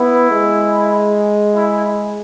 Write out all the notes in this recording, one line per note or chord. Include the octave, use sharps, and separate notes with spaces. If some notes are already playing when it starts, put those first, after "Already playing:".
Already playing: B3 E4
G#3
E4